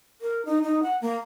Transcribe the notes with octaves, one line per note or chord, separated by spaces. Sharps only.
A#4
D#4
D#4
F#5
A#3